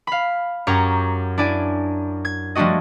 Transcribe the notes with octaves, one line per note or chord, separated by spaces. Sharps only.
F5 B5
F#2 G4 C#5 A#5
D4 E4 D5 G#5
G#6
F3 G3 A3 D4 F#4 D#5